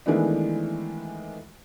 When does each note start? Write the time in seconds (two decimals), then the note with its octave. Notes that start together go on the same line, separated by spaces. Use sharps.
0.06 D#3 E3 G#3 A3 B3 D4